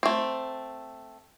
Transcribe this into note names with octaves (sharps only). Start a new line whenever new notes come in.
A3 C4